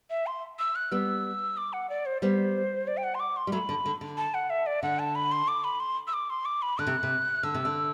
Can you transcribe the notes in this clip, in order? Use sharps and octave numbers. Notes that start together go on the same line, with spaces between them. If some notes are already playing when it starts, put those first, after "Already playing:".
E5
C6
E6
F#6
G3 B3 E6
D6
F#5
D5
C5
G3 B3 C5
D5
G5
F#5
C6
D6
C6
G3
F#3 A3 B5
D3
D3
D3
A5
F#5
E5
D5
D3 F#5
A5
B5
C6
D6
B5
C6
E6
D6
C6
D6
B5
D3 F#6
C3
C3
D3 E6
C3
D3